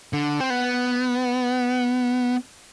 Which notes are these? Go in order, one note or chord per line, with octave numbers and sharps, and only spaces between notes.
D3
C4
B3